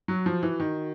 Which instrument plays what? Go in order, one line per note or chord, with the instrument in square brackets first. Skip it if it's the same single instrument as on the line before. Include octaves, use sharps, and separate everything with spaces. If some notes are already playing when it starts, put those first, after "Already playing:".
[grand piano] F#3 [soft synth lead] F#4
[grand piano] F3
E3
D#3